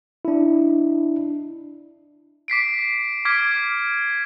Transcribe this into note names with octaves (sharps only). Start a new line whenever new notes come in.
D4 E4
D6 B6 C7 D7
D6 F6 G#6 B6 D7